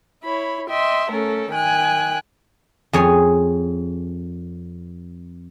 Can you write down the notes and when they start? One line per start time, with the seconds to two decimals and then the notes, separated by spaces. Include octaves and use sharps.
0.24 E4 C#5 B5
0.68 D#5 E5 G5 C6
1.11 A3 C#4 A4 A#4
1.51 D#3 G5 G#5 F#6
2.93 F2 G#4 C#5